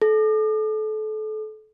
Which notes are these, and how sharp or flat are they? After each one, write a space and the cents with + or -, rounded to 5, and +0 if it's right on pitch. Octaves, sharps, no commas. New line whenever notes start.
A4 -30